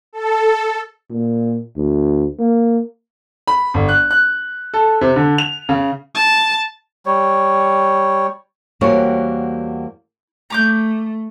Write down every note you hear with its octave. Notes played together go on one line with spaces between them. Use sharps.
A4
A#2
D2
A#3
B5
G1
F#6
F#6
A4
C3
D3
F7
C#3
A5
G3 C#5
E2 G3 A#3 C4 F#4 C#5
A3 A#5 D6 G6